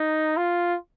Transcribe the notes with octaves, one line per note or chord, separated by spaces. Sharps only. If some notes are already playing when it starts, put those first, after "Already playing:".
Already playing: D#4
F4